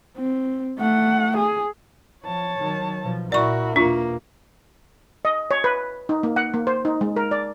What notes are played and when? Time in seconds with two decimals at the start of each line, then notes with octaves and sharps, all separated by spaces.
0.17 C4
0.79 A3 F#5
1.37 G#4
2.25 F3 C#5 A5
2.58 D#3 F#3
3.03 B2 F3
3.32 A#2 E4 F#4 A#4 D5 C#6
3.76 E2 B2 A#3 D4 F4
5.25 D#5
5.51 C#5
5.64 B4
6.09 D#4
6.23 A#3
6.36 F#5
6.54 A#3
6.67 C5
6.85 D#4
7.01 G#3
7.16 A#4
7.31 D5